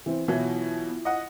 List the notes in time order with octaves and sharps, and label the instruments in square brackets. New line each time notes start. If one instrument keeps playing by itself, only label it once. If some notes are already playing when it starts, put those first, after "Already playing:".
[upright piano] E3 C4
[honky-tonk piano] B2 E3 F#3 [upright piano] E4 F4
[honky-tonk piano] D#5 F#5